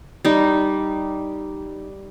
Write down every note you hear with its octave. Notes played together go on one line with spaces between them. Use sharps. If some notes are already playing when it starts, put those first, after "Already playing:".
G3 D#4